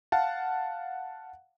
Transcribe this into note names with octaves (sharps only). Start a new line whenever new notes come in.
F5 F#5 A5